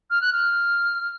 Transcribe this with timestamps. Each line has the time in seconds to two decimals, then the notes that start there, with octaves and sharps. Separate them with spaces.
0.10 F6
0.21 F#6
0.32 F6